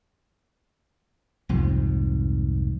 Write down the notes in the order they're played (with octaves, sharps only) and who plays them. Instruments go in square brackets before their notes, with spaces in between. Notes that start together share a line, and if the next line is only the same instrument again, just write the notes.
[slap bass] C2 F2 G#2 F3